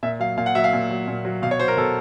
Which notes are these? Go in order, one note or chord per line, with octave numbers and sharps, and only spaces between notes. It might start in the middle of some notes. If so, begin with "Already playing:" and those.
A#2 E5
F#3 F5
A#2 F5
F#5
F#3 E5
F5
A#2
F#3
A#2
F#3
B2 F5
C#5
F#3 C5
A#4
B2 A4